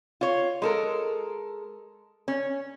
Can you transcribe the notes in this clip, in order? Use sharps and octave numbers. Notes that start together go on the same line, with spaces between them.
F4 C#5
G#3 A4 A#4
C#4